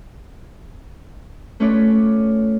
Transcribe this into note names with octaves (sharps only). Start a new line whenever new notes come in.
A3 C#4 F4 B4 C#5 D5